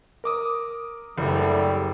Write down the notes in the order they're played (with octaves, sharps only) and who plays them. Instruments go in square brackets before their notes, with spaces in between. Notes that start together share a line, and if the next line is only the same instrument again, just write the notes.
[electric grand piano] A#4 D6 D#6
[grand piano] F#1 [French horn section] D2 G3 A3